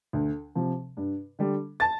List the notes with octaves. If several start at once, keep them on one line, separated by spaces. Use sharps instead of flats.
D2
C3 F3
G2
D3 G3
A5 A6